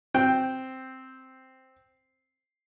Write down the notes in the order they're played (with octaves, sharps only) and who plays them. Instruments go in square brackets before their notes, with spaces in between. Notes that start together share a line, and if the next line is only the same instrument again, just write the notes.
[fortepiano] C4 G5